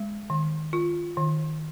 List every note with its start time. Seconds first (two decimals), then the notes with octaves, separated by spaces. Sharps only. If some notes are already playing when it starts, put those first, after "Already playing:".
Already playing: G#3
0.30 D#3
0.73 F4
1.17 D#3